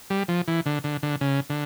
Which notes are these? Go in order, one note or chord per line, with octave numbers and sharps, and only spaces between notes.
G3
F3
E3
D3
D3
D3
C#3
D3